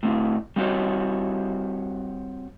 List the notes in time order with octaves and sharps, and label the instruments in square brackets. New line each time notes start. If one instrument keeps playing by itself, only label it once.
[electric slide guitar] A2 C4 E4
G3 C4 F#4 C#5